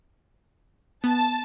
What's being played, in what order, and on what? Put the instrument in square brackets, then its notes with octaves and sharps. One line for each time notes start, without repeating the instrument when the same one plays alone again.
[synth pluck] B3 [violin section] A5